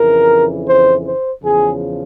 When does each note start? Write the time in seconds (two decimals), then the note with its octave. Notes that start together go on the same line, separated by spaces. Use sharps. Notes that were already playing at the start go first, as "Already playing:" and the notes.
Already playing: F2 C#3 E3 A#4
0.66 C5
1.04 C5
1.43 E2 C#3 F3 G#4